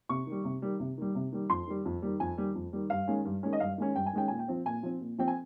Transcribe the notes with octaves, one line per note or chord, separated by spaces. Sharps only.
C3 C#6
D#3 G3
C3
D#3 G3
C3
D#3 G3
C3
D#3 G3
F2 C6
D#3 G3
F2
D#3 G3
F2 G#5
D#3 G3
F2
D#3 G3
G2 F5
D#3 G#3 C#4
G2
D#3 G#3 C#4
D#5
G2 F5
D#3 G#3 C#4
G2 G5
G#5
D#3 G#3 C#4 G5
A#2 G#5
G5
F3 C4
A#2 G#5
F3 C4
A#2
F3 C4 G5
G#5